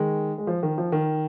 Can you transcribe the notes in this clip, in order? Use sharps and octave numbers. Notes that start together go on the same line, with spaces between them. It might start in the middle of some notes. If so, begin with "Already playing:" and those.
Already playing: D#3 G#3
G#3
F3
D#3
F3
D#3